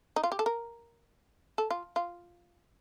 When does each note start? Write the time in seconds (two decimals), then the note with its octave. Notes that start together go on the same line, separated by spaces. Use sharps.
0.16 D#4
0.23 F4
0.32 G4
0.39 A4
0.46 A#4
1.58 A4
1.70 F4
1.96 F4